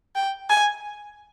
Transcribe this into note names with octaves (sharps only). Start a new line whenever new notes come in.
G5
G#5